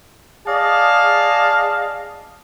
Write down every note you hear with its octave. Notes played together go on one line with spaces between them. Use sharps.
G#4 D5 D#5 F5 A5